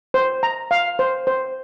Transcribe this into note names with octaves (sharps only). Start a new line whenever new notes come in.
C5
A#5
F5
C5
C5